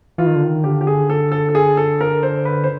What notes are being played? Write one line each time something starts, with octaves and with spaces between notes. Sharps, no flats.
E3 F4
D#3
D3
D#3
D3 G4
G4
G#4
A4
A4
A4
G#4
A4
A#4
C5
B4
C5